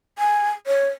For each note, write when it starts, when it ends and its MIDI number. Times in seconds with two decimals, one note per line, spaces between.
0.19 0.48 80
0.67 0.88 73